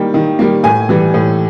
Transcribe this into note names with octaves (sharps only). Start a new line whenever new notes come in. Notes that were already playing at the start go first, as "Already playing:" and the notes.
Already playing: D#3 G3 A#3 G5
D#3
G3 A#3
A2 G#5
E3 G3
A2